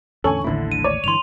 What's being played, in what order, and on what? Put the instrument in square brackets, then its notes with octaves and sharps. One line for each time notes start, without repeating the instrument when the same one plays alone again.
[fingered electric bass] E2 A2 D3 [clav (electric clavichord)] C#4 A4 [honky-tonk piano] G#5 C#6 F#7
[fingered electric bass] A1 D#2 A2 [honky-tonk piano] D3 E4
[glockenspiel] D#7
[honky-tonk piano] C#5 [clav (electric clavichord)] D5
[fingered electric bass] G2 D3 E3 [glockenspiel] C6 F7